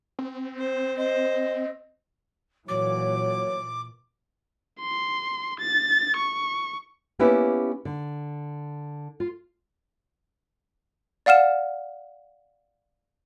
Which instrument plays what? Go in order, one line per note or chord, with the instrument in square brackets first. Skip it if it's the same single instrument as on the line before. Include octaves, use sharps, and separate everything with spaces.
[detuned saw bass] C4
[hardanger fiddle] C5
[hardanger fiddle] C5 [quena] D#5
[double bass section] A#2 E3 [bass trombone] F#3 [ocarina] C#5 [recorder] D6
[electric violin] C6
A6
C#6
[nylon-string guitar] A#3 B3 C#4 E4 G4 B4
D3
F4
[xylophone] D5 F5 F#5 F6 E7